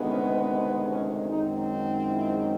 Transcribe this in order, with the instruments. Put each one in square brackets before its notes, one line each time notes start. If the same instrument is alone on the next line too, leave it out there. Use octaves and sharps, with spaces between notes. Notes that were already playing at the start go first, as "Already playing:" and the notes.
Already playing: [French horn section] D2 C3 D#3 G#3 B3
C#4
C4
C#4
F#2 D#3 G#3 C4 D#4
D#4
E4